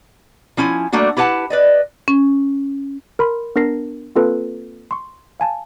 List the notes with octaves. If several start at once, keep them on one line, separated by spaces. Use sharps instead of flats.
F3 C#4 E4 G#5
G3 A3 A#3 D4 F#4
E4 G4 B4 F#5 A5
B4 D5 D#5
C#4
A#4 B5 C6
B3 D4 A#4 A#6 C7
A#3 C4 F4 A4 B4
C6 C#6
F5 G#5 A5